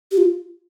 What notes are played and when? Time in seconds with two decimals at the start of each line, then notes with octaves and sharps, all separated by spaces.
0.12 G4
0.18 F4